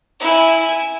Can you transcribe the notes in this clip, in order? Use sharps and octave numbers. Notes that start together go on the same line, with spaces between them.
E4 G#5